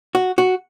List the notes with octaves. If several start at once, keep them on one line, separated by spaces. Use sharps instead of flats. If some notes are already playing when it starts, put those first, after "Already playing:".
F#4
F#4